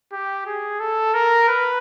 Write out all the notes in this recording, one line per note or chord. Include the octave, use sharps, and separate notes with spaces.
G4
G#4
A4
A#4
B4